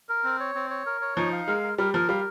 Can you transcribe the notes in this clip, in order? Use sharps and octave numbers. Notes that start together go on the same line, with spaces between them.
A#4
C4
C#5
C4
C#5
A#4
C#5
F3 D#4
F5
G#3 A#4
A#4
G3 A#4
F3 A#4
G3 F5